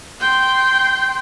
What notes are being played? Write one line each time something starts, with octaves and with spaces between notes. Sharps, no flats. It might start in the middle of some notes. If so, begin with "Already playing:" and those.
G5 C6